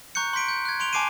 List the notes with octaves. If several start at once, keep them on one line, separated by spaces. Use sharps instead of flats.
A#5 C#6 F#6 G6 C#7
C6 G6 B6 D7
G6
F#6 G#6
C6 D7 F7 G7
G#5 A5 D6 C7 D7 D#7